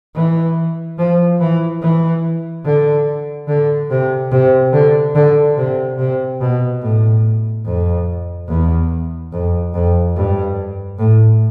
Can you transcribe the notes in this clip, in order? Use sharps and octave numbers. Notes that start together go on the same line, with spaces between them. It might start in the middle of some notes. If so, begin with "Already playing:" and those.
E3
F3
E3
E3
D3
D3
C3
C3
D3
D3
C3
C3
B2
A2
F2
E2
F2
F2
G2
A2